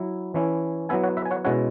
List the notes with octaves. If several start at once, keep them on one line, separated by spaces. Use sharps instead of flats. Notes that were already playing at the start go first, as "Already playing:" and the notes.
Already playing: F#3 E4
E3 C#4 E4
F#3 B3 E4 E5 G#5
C#5 F#5
B4 E5
G#5
C#5 F#5
B2 G#3 C#4 E4 C#5 F#5